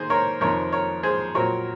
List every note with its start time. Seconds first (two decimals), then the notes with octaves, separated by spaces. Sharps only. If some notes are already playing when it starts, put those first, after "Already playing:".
Already playing: D#3 A#3 G#4 C5
0.10 A#4 C#5
0.41 F2 C3 D#3 A#4 C#5
0.72 A#4 C#5
1.03 G#4 C5
1.35 A#2 F#3 C4 A#4 C#5